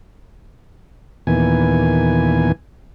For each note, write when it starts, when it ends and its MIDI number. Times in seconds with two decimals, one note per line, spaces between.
1.27 2.52 39
1.27 2.52 46
1.27 2.52 52
1.27 2.52 59
1.27 2.52 80